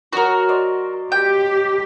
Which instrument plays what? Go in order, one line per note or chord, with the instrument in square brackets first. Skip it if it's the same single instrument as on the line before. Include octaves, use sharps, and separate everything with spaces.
[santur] F#3 C#5 D#6 [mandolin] F#4 A#4
[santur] C5 D5 D#5
[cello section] G4 [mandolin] G5